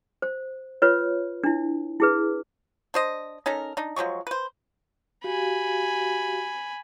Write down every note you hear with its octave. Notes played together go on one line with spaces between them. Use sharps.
C5
F4 B4 C#5
D4 E4
E4 G#4 B4
D4 C5 D#5
C#4 D#4 A4 A#4
D4 D#4
F3 F#3 G#3 C#6
B4 C5
F#4 G4 F5 G#5 B5